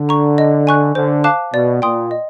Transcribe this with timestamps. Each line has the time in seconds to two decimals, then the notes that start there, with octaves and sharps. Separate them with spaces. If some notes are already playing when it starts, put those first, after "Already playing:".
Already playing: D3
0.09 A#5 C#6
0.38 D#5
0.67 G#5 C#6 F#6
0.95 D3 C5
1.24 F5 A5 D6 F#6
1.53 B2 D5
1.82 A#2 G5 C6 D#6
2.11 D#5